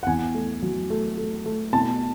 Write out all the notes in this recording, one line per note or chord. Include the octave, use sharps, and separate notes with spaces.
F#5
E2 G#5
A3
F#3
A3
A3
A3
B2 A5